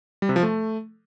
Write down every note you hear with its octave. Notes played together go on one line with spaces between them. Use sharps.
G3
C3
F3
A3